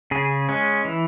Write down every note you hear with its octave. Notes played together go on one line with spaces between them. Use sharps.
C#3 G#4
G#3 C#4
E3